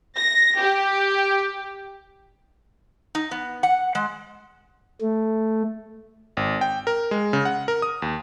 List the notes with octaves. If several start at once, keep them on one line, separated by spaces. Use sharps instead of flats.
A#6
G4
D#4
B3
F#5
G#3
A3
G#1
G5
A#4
G#3
C#3
F#5
A#4
D#6
D#2